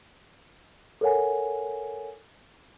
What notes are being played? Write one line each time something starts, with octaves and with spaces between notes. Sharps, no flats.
A4 A#4 C#5 F#5 G#5